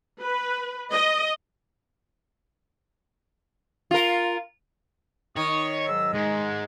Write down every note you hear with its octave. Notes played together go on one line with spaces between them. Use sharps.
B4
D#5
F4 A#4
D#3 C#5 C#6 D#6
G#2 F#3 E6
G#2 G#3